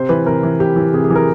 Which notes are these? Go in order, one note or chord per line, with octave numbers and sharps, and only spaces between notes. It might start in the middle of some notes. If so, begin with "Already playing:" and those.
Already playing: C3 C5
E3 B4
C3 A#4
E3
C3 G4
E3
C3 G#4
G#4
E3
A#4